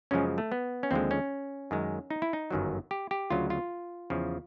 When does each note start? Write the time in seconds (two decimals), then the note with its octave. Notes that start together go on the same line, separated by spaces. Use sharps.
0.11 F#2 C#3 F3 G#3 C#4
0.38 A3
0.52 B3
0.83 C#4
0.91 D#2 D3 F3 G#3 C4
1.11 C#4
1.71 F#2 D#3 G#3
2.10 D#4
2.22 E4
2.33 D#4
2.51 G1 F#2 D#3 F#3
2.91 G4
3.11 G4
3.30 D2 C#3 F#3 F4
3.50 F4
4.10 E2 C#3 F3